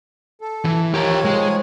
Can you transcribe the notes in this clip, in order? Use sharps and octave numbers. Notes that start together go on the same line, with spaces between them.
A4
E3
D#3 F3 G4 A#4 C#5
G#3